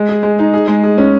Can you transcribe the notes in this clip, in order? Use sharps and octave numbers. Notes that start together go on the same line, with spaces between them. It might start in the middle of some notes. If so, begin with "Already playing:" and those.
Already playing: G#3
G#4
G#3
D#4
G#4
G#3
G#4
C#4